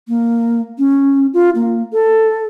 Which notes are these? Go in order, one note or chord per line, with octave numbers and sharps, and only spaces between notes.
A#3
C#4
F4
A#3
A4